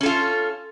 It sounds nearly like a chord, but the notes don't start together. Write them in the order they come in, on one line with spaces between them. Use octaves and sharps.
C#4 A4 F4